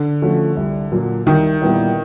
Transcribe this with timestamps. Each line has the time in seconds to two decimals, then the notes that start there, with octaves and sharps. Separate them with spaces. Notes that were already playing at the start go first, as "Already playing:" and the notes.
Already playing: D3
0.22 F3 A3 C#4 F#4
0.57 C2
0.92 A#2 F#3
1.26 C2 D#3
1.62 A#2 G3 B3 E4